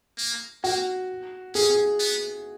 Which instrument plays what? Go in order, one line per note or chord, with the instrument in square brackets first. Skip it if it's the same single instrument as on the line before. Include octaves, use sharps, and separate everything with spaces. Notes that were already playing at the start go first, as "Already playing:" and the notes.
[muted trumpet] A#3
[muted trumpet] A#3 [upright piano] F#4
[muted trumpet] C#4 [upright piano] G#4
[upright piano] G#4
[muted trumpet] B3